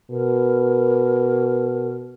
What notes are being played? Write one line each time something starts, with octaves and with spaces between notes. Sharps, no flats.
B2 A#4